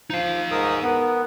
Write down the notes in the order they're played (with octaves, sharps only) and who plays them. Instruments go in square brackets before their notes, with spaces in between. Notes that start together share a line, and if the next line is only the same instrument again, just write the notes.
[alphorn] F3 [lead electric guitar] D#4 F5
[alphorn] G#2 [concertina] A#4 D#6
[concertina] B3 [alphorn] A#4